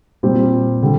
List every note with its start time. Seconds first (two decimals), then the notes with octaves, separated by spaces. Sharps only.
0.23 A#2 G3 C4 G4 C5
0.82 D3 G3